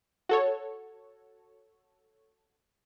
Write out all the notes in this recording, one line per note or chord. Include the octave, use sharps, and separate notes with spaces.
F#4 A4 C#5